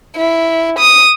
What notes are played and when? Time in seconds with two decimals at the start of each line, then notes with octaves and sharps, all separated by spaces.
0.16 E4
0.79 D#6